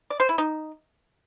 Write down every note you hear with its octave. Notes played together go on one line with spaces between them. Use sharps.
D5
C5
E4
D#4